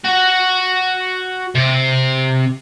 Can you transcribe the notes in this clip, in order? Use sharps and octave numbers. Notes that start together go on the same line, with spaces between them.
F#4 F#5
C3